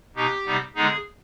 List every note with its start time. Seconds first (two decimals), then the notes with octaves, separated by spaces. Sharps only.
0.15 B2 B3 D#4 G4
0.45 C3 G3 B3 D#4
0.75 D3 G#3 B3 D#4 G#4